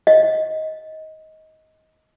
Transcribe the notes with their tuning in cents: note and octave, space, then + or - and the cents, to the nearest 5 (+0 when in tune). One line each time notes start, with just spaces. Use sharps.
D#5 +15